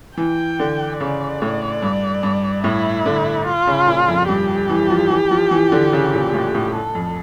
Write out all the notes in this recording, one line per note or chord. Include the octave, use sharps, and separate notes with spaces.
E3 G5
D3
C#3 D5
A2
G2
G2
A2 E4
D3
F4
C#3
A#2
F2
G2 G4
E3
F3
E3
F3
E3
D3
C#3
A#2
A2
A2
A4
F2